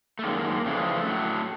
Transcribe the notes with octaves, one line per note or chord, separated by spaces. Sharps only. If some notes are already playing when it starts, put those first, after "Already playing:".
A3
F#2 D#3 G#3 A#3
F2 C#3 E3 G#3 A3
A2 F#3